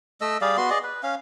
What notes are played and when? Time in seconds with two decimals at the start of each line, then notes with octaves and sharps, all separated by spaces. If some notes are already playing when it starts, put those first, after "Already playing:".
0.21 A3 D#5 E6
0.41 G3 G#4 D5 F5
0.57 B3 F#4 C6
0.70 G#4 D5 D#5
0.83 B4
1.03 C#4 F5